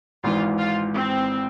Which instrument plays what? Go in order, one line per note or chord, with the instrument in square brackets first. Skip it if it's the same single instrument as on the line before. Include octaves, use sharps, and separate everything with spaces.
[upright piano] G#1 G#2 E3 [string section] F4
[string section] F4
C4